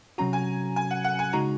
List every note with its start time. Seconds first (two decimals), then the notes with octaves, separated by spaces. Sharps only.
0.18 C3 F#3 C#4 F#4 A#5
0.33 G#5
0.76 G#5
0.91 F#5
1.04 F#5
1.19 G#5
1.33 C#3 G#3 D#4 F#4 A#5